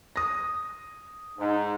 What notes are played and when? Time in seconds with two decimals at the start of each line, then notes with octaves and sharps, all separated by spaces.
0.16 D#6 A#6
1.39 G#2 D#4